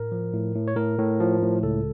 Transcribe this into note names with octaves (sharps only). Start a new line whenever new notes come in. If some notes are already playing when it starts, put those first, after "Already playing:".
Already playing: A2 A#4
F3
A2
A2
C#5
A2 A#4
A2
F3
A2
C#2 A4